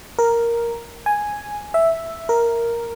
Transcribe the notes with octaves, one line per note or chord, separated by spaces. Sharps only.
A#4
G#5
E5
A#4